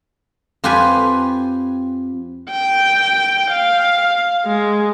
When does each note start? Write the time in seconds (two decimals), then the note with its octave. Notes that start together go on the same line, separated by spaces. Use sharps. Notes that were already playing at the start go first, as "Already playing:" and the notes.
0.64 F2 F4 G4 B4 G#5
2.51 G5
3.51 F5
4.46 G#3